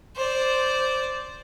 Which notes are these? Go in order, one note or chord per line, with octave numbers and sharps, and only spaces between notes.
C5 D5